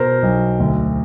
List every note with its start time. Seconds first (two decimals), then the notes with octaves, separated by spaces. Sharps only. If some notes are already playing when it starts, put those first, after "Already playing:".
Already playing: B2 A#4 C5
0.22 B1
0.60 D2